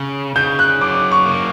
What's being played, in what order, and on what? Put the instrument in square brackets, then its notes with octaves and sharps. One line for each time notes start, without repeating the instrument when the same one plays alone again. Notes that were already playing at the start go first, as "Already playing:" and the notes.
Already playing: [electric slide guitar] C#3
[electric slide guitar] C#3 [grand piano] G6
[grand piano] F#6
[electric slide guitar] F#3 [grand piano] D6
[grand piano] C#6
[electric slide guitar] A#3